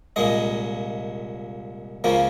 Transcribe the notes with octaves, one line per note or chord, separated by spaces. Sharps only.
C2 A#2 G#3 D#5
C#2 C#3 F3 A#3